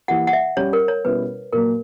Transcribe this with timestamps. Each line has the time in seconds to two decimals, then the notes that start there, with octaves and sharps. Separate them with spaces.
0.08 E3 A#3 E4 G4 F#5
0.27 F#5
0.33 E5
0.57 G3 C#4 G4 C#5
0.73 A#4
0.88 C#5
1.05 B2 G3 C#4 E4 B4
1.53 A#2 F#3 A#3 A#4